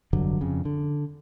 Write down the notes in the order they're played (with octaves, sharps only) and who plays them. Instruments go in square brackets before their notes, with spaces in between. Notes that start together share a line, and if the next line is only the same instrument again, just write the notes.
[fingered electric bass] F1 G2 D3 F#3
F2 C#3
D3